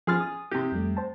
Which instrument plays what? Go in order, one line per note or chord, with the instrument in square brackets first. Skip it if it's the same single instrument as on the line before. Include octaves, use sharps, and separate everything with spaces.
[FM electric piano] F3 C6 A6 [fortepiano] G#4 F6
[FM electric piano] D#6
[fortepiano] C3 G4
[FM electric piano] F2 G3 A3
C5 A5